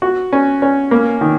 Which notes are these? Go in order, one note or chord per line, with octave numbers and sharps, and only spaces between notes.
F#4
C#4
C#4
A#3
D#3